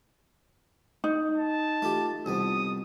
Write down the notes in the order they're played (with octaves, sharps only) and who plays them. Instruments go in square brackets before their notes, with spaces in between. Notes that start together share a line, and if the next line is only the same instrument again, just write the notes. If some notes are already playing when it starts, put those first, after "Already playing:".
[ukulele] D#4
[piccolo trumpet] A5
[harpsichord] A3 F4 G4
[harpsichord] C2 F2 B3 [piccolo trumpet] D#6